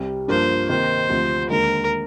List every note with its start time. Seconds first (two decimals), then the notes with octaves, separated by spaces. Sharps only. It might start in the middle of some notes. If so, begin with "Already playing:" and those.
Already playing: C2 C3 G3
0.28 G2 F3 A#3 D4 C5
0.69 C3 D#3 A#3 D#4 C5
1.09 D2 C3 F3
1.50 D#2 D3 G#3 A#4